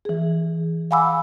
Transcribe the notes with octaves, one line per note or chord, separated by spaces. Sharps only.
E3 G#4
F5 F#5 G#5 B5 D6 E6